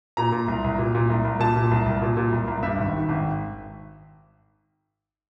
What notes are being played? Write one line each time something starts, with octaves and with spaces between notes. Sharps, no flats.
A#2 A#5
A#2
C2
C2
A#2
A#2
C2
C2
A#2 A5
A#2
C2
C2
A#2
A#2
C2
C2
G2 E5
G#1
D#3
G#1